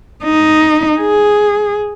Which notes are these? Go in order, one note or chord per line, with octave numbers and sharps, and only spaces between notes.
D#4
G#4